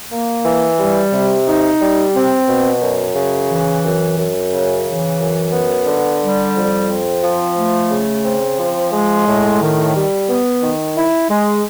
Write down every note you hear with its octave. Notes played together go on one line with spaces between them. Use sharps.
A#3
E3
G3
C3
D#4
G3
C4
B2
F#2
C#3
E3
F#2
F#2
C#3
E3
F#2
B3
D3
G3
F2
C4
F3
A3
C#3
C4
F3
G#3
A2
D#3
G3
B3
D#3
E4
G#3